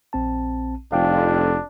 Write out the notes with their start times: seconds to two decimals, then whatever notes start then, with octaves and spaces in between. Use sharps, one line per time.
0.13 A#1 C4 A5
0.92 F1 F2 D4 F5 G5